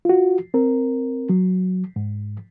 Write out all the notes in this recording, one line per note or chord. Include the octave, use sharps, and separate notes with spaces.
F4 F#4
C4 A#4
F#3
G#2